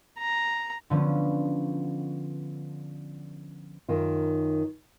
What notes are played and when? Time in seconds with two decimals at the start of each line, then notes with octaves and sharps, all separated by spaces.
0.18 A#5
0.90 D3 F3 B3 C#4
3.89 F#2 D#3 F4